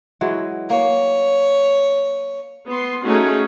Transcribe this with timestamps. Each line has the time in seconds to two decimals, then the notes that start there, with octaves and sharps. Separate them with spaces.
0.21 E3 F#3 G#3
0.70 A#3 C#5
2.68 B3 C6
3.05 A3 C#4 D#4 F#4 G#4